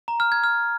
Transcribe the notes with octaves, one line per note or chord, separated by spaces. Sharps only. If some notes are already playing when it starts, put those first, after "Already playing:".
A#5
F6
G#6
F6